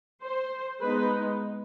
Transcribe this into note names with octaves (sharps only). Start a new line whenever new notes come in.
C5
G#3 B3 D#4 B4